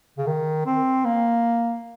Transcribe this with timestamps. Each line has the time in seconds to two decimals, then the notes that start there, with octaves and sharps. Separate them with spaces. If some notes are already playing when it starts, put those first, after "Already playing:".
0.18 C#3
0.27 D#3
0.66 C4
1.05 A#3